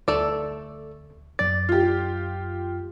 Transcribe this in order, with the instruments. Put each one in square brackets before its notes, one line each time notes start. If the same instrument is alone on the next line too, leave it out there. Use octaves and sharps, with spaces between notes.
[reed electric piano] D2 [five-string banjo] A3 A4 D5
[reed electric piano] F#2 A6 [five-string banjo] D5
[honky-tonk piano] F4 G4